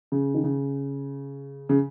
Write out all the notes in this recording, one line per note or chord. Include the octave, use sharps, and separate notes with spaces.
C#3
D#3
C#3
C#3